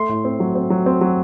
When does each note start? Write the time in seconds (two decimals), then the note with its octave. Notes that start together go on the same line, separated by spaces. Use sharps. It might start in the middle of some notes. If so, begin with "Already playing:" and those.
Already playing: A3 C6
0.09 A2
0.25 C4
0.40 F#3
0.55 C4
0.70 F#3
0.86 C4
1.01 F#3